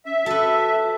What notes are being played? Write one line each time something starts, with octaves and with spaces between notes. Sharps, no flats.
C#4 E5
F#4 A4 B4 A5 E6